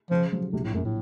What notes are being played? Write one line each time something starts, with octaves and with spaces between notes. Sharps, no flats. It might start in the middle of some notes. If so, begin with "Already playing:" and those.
C#3 F3
F3 F#3
A#1 C3
A2
A#1 F#2
A2